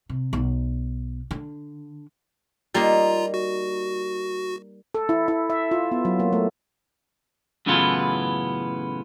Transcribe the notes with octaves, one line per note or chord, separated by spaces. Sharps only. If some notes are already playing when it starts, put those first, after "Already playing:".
C3
B1
D3
G3 A#3 D#4 F4 A#5
F#4
A4
E4
E4
E5
F4
B3
F#3
A#3
A3
F#2 A2 C#3 E3 B3 F4